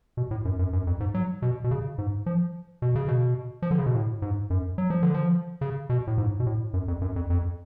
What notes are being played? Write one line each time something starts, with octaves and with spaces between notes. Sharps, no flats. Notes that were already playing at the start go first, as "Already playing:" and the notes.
B2
A2
F#2
F#2
F#2
F2
G#2
F#3
B2
B2
C#3
G#2
F3
B2
C#3
B2
F3
D3
C#3
B2
A2
G#2
F#2
F#3
F3
D3
F3
C#3
B2
A2
G#2
B2
A2
F#2
F2
F#2
F2
F2